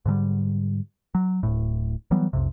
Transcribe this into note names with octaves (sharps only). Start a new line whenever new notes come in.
G#2 D3 F3 G3
F#3
D1 G#1 A2
E3 F#3 G3 B3
B1 F2 C3